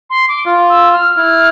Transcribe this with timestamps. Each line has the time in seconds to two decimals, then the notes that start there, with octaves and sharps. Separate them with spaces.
0.10 C6
0.28 D6
0.46 F4
0.70 E6
0.93 F6
1.17 E4 F6